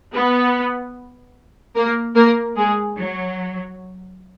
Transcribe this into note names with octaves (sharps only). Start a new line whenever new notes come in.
B3 B4
A#3 A#4
A#3 A#4
G#3 G#4
F#3